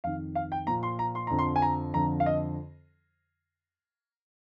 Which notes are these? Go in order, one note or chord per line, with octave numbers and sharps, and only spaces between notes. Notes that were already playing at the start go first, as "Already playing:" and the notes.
F2 D#3 F5
F5
G5
A#2 F3 A#5
C6
A#5
C6
F2 D3 F3 A#5
C6
G#5
A#5
F2 D3 F3 A#5
F5
D#5